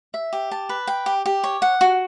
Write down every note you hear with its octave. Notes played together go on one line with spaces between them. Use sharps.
E5
G4
A5
B4
G5
G4
G4
C#5
F#5
F#4